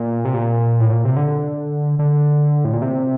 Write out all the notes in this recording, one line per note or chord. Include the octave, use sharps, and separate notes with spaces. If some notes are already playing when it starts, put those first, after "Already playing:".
Already playing: A#2
C3
A#2
A2
A#2
C3
D3
D3
A2
A#2
C3